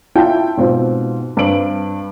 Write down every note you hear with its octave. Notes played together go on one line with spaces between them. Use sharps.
E4 F4 E5 F5 G5 A5
G#2 B2 C4 F4
G2 C4 B4 D7 F#7